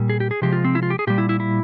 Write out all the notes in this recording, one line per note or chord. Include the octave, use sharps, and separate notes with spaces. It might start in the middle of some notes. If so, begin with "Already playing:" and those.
Already playing: A#2 G3
G#4
G4
G#4
C3 F3 G#3 G4
F4
C4
E4
F4
G4
G#4
A#2 G3 G4
E4
E4
E4